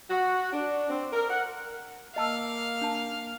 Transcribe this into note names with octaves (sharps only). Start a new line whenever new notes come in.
F#4
D4
C4
A#4
F#5
A#3 D#5 F5 A5 E6
D4 A5